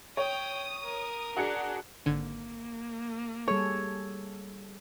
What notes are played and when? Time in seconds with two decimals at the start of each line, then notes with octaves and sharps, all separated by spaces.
0.17 C#5 G5 D#6
0.83 A#4
1.37 D4 F#4 G#4 C#7
2.06 G#1 D3 A#3 G#6
3.48 G3 G#4 A4 C#5